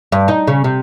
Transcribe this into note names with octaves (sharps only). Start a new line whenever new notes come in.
G2
D#4
C#3
C3